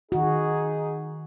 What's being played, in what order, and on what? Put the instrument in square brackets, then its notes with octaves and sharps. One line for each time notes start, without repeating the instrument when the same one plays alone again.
[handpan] D#3 F#4 [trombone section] D#4 G#4